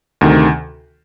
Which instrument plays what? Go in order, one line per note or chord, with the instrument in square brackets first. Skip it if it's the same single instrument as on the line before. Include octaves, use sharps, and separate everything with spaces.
[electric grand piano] D2 C3 D#3